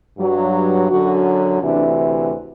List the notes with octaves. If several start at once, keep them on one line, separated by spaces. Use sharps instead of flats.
G2 F#3
F#2 D3 F#3 F#4
D2 C3 E3 D4